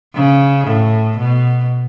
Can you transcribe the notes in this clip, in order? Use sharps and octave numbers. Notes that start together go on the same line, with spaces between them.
C#3
A2
B2